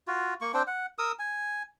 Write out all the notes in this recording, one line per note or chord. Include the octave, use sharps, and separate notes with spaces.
F4 F#4
A#3 C#6
C4 D4 C5 G5
F#5
A#4 D#6 E6
G#5